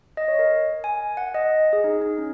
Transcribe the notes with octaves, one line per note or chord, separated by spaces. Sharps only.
D#5
C#5
A#4
G#5
F#5
D#5
G#4
D#4
D#4
C#4